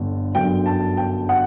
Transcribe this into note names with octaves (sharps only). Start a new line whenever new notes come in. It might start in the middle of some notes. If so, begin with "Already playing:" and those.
Already playing: G1 G2 D3
G1 F#2 D3 G5
A5
G5
F#5